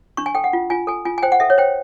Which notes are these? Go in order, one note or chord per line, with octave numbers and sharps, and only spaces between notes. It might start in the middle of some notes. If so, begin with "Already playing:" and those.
D4 C#6
G#5
A4 G5
F#5
F4
F4 G#5
A4 G#5
F4 G#5
G#5
C5 G5
F#5
A4 E5
C#5
C5 G5